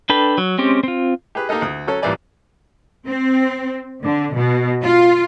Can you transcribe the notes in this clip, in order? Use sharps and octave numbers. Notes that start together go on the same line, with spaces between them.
D4 A4 B4 G5 B5
F#3
G#3 C4 C#4 G4
C4 F4
G4 G#4 B4
A#3 D#4 G4 A4 D#5
D2 D#6
F#3 C#4 A4
A1 A#2 E3 G3 D5 G#5
C4
D3
B2
F4